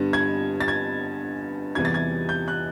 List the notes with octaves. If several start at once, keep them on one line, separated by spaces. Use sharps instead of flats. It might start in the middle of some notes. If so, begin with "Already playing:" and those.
Already playing: G2 D3 G3 B3
G#6
A6
G#6
E2 C3 E3 G3 B3 G#6
A6
G#6
G6
F#6